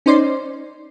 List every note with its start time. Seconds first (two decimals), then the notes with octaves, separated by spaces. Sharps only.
0.06 C#4 D#4 C5 D5 C6